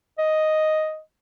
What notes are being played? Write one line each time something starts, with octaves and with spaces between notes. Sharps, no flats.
D#5